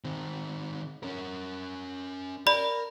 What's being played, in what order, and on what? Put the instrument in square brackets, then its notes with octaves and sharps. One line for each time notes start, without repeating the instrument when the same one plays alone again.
[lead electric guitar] D#3 C4
C#4 A#4
[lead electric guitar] A#4 [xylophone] D5 B5